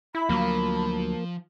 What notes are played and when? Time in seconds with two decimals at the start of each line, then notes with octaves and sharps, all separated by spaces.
0.15 E4 B5
0.29 D2 F3 F#3 A#3